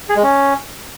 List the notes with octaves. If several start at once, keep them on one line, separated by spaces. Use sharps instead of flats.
G#4
G#3
C#4